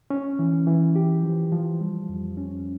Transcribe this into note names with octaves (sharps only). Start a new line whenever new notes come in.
C#4
E3
E3
G4
F3
F3
G3
F2
C#4